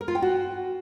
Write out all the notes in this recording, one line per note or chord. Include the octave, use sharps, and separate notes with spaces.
A#4
F4
G5
F#4